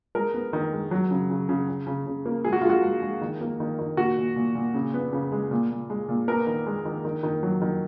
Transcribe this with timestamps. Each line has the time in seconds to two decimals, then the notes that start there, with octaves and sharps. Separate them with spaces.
0.15 G#3 A#4
0.34 B3
0.53 D#3
0.73 G#3
0.91 F#3
1.11 C#3
1.30 C#3
1.49 C#3
1.68 C#3
1.87 C#3
2.06 C#3
2.26 A#3
2.44 G#3 G#4
2.53 F#4
2.61 G#3 F4
2.70 F#4
2.83 G#3
3.02 G#3
3.22 D#3
3.41 A#3
3.60 D#3
3.79 D#3
3.97 A#2 F#4
4.17 A#2
4.36 A#2
4.55 A#2
4.74 C#3
4.94 B3
5.13 C#3
5.32 G#3
5.51 A#2
5.70 A#2
5.90 G#3
6.09 A#2
6.28 B3 A#4
6.47 D#3
6.66 G#3
6.85 D#3
7.05 D#3
7.23 D#3
7.43 F#3
7.62 D#3